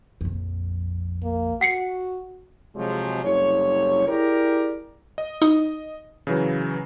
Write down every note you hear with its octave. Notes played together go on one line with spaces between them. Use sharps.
A#1 F2
A#3
F#4 F#5 C7 C#7
C3 F3 F#3 G#3
F#1 C2 C#5
E4 G4 G#4 A#4 D5
D#5
D#4
C#3 E3 F#3